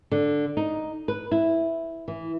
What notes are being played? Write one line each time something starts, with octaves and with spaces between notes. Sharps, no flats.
D3
D#4
B4
E4
E3